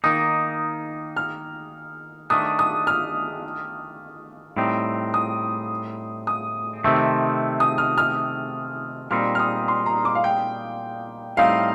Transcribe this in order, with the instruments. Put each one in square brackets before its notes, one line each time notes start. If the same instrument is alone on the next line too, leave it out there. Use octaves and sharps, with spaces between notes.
[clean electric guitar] D#3 A#3 D#4 [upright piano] D#6
[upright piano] F6
[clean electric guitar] D#3 A3 D4 [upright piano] D#6
[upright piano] D#6
F6
[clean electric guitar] A2 G3 C4 D#4
[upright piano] D#6
D#6
[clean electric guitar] C3 D#3 A3 C4
[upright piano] D#6
F6
F6
[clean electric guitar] A#2 G3 C4 D#4 [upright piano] F6
[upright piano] F6
D#6
C6
A#5
D6
F5
G5
[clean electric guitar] A2 G3 C4 D#4 [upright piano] F5